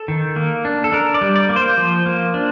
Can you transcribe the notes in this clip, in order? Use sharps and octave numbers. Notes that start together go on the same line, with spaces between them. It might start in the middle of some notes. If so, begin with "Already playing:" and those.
Already playing: A4
D#3
A#3
D4
A4
D4 A#4
D5
G3
D5
A#3
C5
F3
A#3
D4